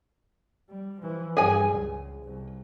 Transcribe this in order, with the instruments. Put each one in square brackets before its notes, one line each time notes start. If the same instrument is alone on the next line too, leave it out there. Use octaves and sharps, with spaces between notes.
[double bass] G3
E3 F3
[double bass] G2 [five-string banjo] G#4 G#5
[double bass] C#2
C2